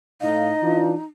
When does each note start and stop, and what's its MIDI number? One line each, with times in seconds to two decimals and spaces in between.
0.21 0.51 45
0.21 1.05 63
0.21 0.81 75
0.21 0.51 77
0.63 0.93 52
0.63 0.93 62
0.63 0.93 65